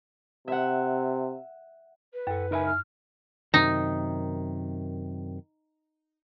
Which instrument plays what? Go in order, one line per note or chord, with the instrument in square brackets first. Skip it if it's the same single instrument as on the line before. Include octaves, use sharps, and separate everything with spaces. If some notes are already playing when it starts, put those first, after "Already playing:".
[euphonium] C3 [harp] E5 F#5
[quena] B4
[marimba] F#2 [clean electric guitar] A4 F#5
[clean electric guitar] C#2 A#4 B5 [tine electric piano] D#4 E5 G#5
[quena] F6
[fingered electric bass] F#2 C3 D#3 [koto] D#4